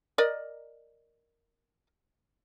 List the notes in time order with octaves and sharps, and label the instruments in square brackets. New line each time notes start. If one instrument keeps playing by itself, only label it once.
[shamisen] A#4 D5 D#5